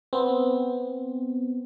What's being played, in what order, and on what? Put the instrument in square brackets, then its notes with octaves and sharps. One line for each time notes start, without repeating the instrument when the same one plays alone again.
[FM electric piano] B3 C4